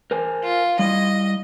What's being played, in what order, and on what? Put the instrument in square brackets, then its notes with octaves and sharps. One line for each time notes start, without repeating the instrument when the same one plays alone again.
[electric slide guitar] A#4 C5 G#5
[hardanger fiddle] F4
[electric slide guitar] G3 E4 [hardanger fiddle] D#5